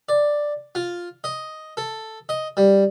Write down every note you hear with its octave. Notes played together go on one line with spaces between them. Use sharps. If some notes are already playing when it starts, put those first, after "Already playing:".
D5
F4
D#5
A4
D#5
G3